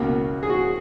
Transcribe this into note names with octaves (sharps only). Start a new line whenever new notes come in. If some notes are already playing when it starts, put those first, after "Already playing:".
Already playing: C#2 B2 A#3
G#4
F#4